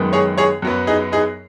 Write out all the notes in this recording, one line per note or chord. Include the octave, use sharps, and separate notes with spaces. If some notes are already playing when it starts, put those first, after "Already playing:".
Already playing: F#2 D#3 G#3 B3
G#4 C#5
G#4 C#5
F#2 F#3 B3
D#4 G#4
D#4 G#4